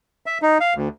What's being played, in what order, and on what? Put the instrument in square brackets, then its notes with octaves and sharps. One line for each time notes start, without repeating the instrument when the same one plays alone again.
[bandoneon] E5
D#4
F5
D2